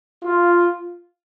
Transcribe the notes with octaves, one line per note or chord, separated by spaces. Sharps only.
F4